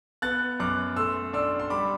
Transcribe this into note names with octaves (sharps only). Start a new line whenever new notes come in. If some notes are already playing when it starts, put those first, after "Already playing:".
B3 F#6 A6
F#2 D6 F#6
A3 C6 E6
D4 C6 E6
C6
G3 B5 D6